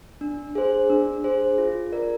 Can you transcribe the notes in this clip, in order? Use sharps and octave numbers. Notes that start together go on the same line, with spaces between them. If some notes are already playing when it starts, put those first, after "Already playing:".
D4
G#4 C5
D4
G#4 C5
F4
A#4 D5